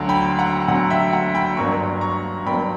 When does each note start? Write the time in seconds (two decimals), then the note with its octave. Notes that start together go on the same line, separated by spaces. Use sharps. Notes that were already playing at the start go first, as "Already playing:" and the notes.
Already playing: D2 D3 F#3
0.09 G5 B5
0.39 F#5 A#5
0.68 D2 D3 F#3 F#5
0.90 E5 G5
1.13 F#5 A#5
1.35 G5 B5
1.57 G1 G2 F#3 A#3 A#5 C#6
2.01 A#5 C#6
2.46 G1 G2 F#3 A#3 G5 B5